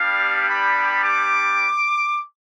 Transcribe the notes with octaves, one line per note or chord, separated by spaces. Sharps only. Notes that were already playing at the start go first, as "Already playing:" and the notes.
Already playing: G3 B3 D4 G4 F5
B5
D6